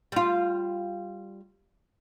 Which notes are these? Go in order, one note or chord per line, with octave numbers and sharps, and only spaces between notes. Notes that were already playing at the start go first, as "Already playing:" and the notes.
G3 F4